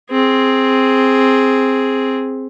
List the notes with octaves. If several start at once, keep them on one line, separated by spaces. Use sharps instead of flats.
C4 G#4